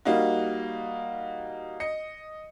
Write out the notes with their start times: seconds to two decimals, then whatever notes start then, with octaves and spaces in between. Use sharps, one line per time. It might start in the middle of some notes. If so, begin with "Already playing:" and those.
0.05 G3 A#3 D#4 F#4
1.80 D#5 C#7